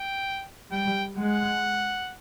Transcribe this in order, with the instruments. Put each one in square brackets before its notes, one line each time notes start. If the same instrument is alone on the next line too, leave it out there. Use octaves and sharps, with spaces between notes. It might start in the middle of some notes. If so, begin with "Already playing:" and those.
Already playing: [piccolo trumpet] G5
[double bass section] G3 [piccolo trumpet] G5
[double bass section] G#3 [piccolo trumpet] F#5